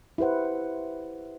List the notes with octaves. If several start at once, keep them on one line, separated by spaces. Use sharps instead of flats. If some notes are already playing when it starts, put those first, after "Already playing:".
E4 G4 B4 C5 F#5